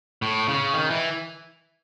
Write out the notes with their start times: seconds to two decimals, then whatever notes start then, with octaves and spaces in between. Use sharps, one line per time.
0.22 A2
0.48 C#3
0.74 D#3
0.91 E3